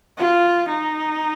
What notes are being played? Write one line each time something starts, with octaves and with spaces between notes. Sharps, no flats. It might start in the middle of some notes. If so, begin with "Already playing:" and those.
F4
D#4